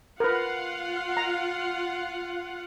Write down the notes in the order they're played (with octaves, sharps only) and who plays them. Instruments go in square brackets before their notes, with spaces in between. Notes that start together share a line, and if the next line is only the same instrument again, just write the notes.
[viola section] F4 F5 F#5 [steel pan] A#4 B4
[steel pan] A#5